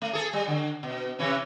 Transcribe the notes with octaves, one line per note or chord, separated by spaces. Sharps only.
A3
G#4 A4
G3
D3
B2
C3 E3 C#4